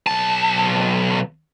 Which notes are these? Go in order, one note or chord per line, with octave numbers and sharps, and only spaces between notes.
B1 A5